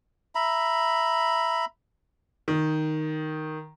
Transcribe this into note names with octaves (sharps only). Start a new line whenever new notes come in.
E5 A#5 B5
D#3